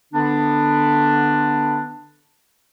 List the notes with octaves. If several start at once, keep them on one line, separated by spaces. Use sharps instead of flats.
D3 B3 D4